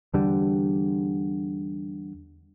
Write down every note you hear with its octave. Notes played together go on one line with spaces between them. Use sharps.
E2 D3 G3